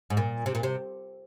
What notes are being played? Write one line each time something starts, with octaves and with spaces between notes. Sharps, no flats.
G#2
A#2
C3
A#2
C3